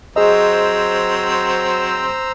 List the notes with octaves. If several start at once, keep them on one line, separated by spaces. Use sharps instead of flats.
F#3 C4 G#4 C5 D#5 A#5 E6